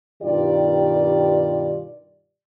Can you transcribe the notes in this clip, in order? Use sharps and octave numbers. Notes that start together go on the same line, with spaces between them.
G2 B2 D#3 F4 G4 D5